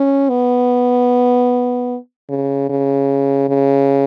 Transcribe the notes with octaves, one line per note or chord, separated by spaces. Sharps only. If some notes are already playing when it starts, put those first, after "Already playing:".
Already playing: C#4
B3
C#3
C#3
C#3